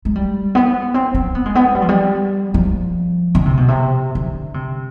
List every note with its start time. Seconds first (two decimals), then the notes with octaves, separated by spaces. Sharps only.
0.05 G#3
0.15 G3
0.55 B3
0.94 C4
1.14 C4
1.35 B3
1.46 G#3
1.55 B3
1.75 G3
1.82 F3
1.89 G3
2.54 F3
3.35 D3
3.46 C3
3.57 B2
3.68 C3
4.15 D3
4.54 C3